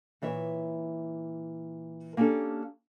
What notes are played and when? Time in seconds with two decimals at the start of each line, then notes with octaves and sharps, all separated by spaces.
0.22 A#2 E3 C#5 E5
2.17 A#3 C#4 D4 G4 A4